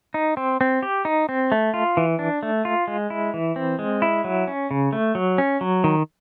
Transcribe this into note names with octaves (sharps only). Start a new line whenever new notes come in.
D#4
C4
C4
G4
D#4
C4
A3
F4
E3
D4
A3
F4
G#3
E4
E3
C4
G#3
E4
F#3
C#4
C#3
A3
F#3
C#4
F#3
D#3